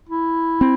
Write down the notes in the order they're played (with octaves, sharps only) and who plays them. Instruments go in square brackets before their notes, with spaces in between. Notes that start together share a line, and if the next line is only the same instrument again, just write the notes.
[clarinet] E4
[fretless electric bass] C4